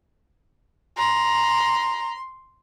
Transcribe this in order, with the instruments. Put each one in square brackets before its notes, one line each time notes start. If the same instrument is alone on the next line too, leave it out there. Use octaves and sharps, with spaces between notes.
[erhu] A#5 [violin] C6